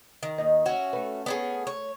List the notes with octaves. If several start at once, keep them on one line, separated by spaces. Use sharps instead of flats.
D#3
D#2 D#4 D#5
C#4 F#4 E5
A3 B4
B3 C#4 G#4
C#5